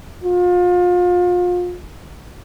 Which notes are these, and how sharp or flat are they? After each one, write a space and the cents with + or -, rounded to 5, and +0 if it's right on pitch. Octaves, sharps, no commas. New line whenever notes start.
F4 +35